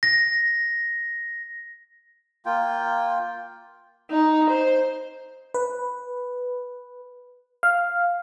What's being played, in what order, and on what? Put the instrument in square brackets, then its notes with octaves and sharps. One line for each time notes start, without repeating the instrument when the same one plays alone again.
[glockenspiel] A#6
[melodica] A#3 F4 G5
[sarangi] D#4
C5
[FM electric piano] B4
F5